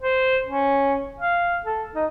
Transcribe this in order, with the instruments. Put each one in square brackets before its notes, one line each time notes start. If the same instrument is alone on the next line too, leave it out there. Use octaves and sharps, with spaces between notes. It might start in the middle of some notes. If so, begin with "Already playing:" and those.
[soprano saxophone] C5
C#4
F5
A4
D#4